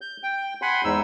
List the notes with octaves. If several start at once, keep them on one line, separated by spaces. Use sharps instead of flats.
G6
G5
F#5 G#5 B5 C6
E2 G#2 D#4 E6